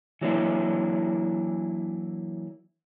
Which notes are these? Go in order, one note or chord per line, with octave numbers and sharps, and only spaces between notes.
E3 F#3 A#3 D4 E4